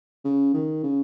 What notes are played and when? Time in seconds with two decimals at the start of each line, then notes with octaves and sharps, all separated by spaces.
0.24 C#3
0.54 D#3
0.83 C#3